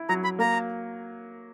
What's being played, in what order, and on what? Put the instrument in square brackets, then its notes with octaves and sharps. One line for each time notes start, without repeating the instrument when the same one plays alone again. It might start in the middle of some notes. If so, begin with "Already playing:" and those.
Already playing: [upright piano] E4
[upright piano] F#3 [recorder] A#5
[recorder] B5
[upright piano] A#3 [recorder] A#5